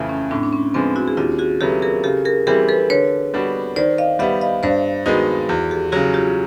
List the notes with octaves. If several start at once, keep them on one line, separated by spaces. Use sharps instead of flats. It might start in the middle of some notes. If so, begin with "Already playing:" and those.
Already playing: F2 C#3 E3 A3
C#4
A2 C4 D4
D4
C#4
F3 G#3 B3 C4 D4
E4 F#4
G#4
D#2 F4 G4
F#4 G#4
C#3 F#3 B3 E4 G4 A4
G#4 A#4
C#3 G4 A4
G#4 A#4
E3 G3 C4 G#4 A#4
A4 B4
D3 B4 C#5
G3 B3 D4 F#4
D#3 C5 D5
D#5 F5
G3 B3 E5 F#5
D#5 F5
G2 C5 D5
D#3 G#3 B3 D#4 F#4 G#4
E2 F#4 G#4
G4 A4
C#3 F#3 F#4 G#4
F4 G4